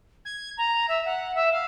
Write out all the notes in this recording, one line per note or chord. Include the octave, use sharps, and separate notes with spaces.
G#6
A#5
E5
F#5
E5
F5